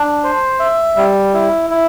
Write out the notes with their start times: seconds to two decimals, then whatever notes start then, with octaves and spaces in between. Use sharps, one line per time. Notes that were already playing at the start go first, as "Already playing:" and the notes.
Already playing: D4
0.24 C5
0.60 E5
0.97 G3
1.34 E4
1.70 E4